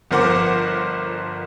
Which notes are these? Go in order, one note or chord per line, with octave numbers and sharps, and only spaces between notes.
G1 F3 A#4 C5 F#5 D6